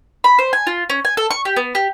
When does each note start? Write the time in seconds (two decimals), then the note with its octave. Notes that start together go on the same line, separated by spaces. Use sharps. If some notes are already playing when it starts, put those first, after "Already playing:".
0.24 B5
0.39 C5
0.53 G#5
0.67 F4
0.90 C#4
1.05 G#5
1.17 A4
1.31 C#6
1.45 G4
1.56 B3
1.75 G4